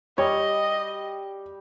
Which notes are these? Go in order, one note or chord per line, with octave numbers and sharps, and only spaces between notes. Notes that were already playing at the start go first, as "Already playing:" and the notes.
G3 C#5 D#5